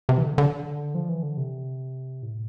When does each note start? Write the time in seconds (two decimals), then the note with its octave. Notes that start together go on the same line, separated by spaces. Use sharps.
0.09 C3
0.18 E3
0.23 D3
0.38 D3
0.95 F3
1.09 E3
1.23 D3
1.37 C3
2.23 A2